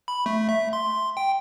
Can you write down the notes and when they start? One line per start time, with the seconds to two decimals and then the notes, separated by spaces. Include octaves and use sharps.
0.08 B5
0.26 A3
0.49 E5
0.73 C6
1.17 G5